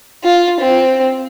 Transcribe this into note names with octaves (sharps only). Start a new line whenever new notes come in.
F4
C4